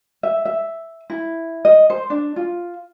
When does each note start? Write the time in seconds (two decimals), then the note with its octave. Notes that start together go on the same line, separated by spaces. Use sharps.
0.23 E5
0.45 E5
1.10 E4
1.65 D#5
1.90 C5
2.10 D4
2.36 F4